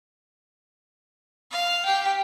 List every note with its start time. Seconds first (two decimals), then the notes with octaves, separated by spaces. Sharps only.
1.51 F5
1.86 G4 G5